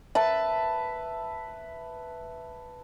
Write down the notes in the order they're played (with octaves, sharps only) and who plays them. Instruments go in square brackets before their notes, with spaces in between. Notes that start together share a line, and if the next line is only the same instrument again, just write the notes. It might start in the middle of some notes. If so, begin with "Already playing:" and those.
[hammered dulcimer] B4 E5 A5